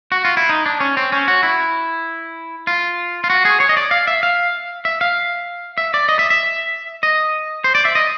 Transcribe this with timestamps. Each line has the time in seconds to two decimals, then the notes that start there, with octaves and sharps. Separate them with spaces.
0.12 F#4
0.25 F4
0.37 E4
0.49 D#4
0.66 D4
0.80 C#4
0.97 C4
1.12 C#4
1.28 F#4
1.43 E4
2.67 F4
3.24 F4
3.30 F#4
3.45 G#4
3.60 C#5
3.69 D#5
3.77 D5
3.91 F5
4.07 E5
4.23 F5
4.85 E5
5.01 F5
5.78 E5
5.94 D5
6.09 D#5
6.19 E5
6.30 E5
7.03 D#5
7.64 C5
7.75 D5
7.85 E5
7.95 D#5